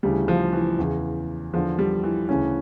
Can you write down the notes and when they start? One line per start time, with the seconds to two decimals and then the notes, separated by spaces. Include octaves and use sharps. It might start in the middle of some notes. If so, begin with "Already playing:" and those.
0.03 D2 C#3 E3 G3
0.28 F3
0.53 E3
0.79 E2 C#3 E3
1.54 E2 D3 F3
1.79 G3
2.04 E3
2.29 D2 C#3 E3 C#4